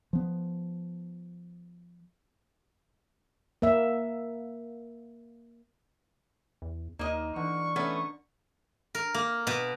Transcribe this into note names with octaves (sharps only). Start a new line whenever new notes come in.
F3 B3
A#3 E5
E2
D#2 A#3 D#4 A#4 D#5
D3 E3 C#6
A3 B3 C#4
A#4
A#3
B2